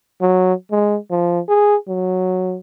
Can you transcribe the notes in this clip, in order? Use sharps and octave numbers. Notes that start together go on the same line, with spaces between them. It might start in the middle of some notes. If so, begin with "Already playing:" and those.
F#3
G#3
F3
G#4
F#3